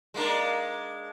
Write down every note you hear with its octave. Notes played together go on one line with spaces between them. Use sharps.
G#3 A#3 D4